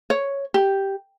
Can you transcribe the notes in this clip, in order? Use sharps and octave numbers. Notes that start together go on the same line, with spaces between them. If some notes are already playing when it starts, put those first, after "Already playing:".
C#5
G4